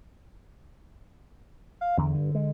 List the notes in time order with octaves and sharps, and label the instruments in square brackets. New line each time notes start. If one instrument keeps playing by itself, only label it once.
[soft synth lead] F5
[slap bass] E2 [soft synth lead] D3
[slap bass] G2
G#3